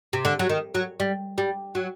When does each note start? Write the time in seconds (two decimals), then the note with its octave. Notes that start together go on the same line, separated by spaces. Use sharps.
0.13 C3
0.25 D3
0.39 F#3
0.49 D#3
0.75 F#3
1.00 G3
1.38 G3
1.75 F#3